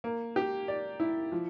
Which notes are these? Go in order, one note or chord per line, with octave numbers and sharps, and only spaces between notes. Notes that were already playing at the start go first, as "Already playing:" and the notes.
A#3
G4
D5
E4
F3